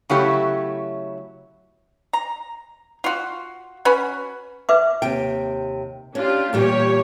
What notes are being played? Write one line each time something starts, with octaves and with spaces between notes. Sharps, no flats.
C#3 F#3 A3 E4 G4 C#5
A#5
F4 F#4
C#4 F#4 B4
B4 E5 D6
D#2 C3 G5
C#4 D4 F4 G4
E2 A#2 G3 A#3 G4 C#5